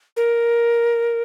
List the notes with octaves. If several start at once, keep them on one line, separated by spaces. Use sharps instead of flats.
A#4